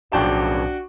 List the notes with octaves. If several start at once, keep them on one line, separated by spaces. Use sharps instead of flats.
B1 A2 C#3 F3 D4 F#4 G5 A5